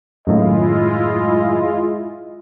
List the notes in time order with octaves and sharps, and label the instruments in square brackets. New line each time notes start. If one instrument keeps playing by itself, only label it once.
[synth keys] F#2 A2 D#3 [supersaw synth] G#3 E4 F4 [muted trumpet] D#5